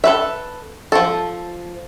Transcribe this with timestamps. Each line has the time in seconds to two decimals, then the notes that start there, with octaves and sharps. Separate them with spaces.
0.04 A4 B4 E5
0.92 F3 A4